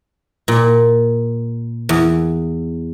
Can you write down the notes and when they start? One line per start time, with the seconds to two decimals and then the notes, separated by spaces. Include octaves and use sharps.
0.48 A#2
1.89 E2